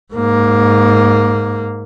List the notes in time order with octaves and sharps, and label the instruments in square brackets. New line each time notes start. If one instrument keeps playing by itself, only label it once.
[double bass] G#2 A#3